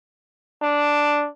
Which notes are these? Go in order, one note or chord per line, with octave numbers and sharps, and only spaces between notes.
D4